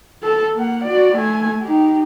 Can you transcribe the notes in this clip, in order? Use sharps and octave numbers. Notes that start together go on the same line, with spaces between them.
A4
A#3 F#5
F#4 D5
A3 G#5
D#4 G4